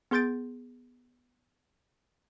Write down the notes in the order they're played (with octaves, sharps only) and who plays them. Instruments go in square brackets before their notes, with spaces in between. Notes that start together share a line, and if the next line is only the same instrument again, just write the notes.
[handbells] B3 G#4 C6 G6 A6 D7